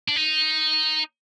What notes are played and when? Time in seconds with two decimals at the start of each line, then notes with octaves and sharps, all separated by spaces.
0.08 D4
0.16 D#4